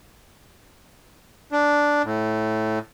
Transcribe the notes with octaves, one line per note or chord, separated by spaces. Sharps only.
D4
A2